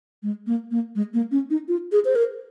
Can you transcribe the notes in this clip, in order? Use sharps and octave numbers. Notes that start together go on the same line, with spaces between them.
G#3
A#3
A#3
G#3
A#3
C#4
D#4
F4
G#4
C5
A#4